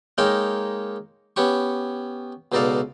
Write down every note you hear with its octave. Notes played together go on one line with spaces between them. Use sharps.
G#3 A#3 D#4 A#4 C#5 G5
B3 C#4 G4 C#6
C#2 B2 D#4 A4 D5 F5